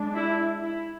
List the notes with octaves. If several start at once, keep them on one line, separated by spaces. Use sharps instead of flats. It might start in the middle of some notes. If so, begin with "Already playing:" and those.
Already playing: G#3 D4
E4
E4